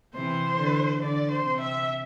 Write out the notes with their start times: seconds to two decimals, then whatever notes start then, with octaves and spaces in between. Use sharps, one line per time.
0.15 C3 E3 C5
0.59 D3
1.02 D3 D5
1.31 C5
1.46 C3
1.61 E5